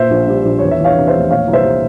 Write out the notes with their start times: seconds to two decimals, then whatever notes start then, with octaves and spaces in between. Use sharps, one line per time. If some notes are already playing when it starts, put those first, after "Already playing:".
Already playing: A#2 C5 E5
0.10 A#1
0.27 G3
0.45 A#1
0.59 E2 C#5
0.71 E5
0.79 E3
0.84 C#5 F5
0.96 C3
1.07 C5 E5
1.13 F1
1.30 A#2 C#5 F5
1.48 C2
1.53 C5 E5
1.65 G3